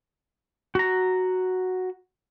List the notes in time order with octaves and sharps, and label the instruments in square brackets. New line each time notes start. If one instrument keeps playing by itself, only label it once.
[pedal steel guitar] F#4 A#5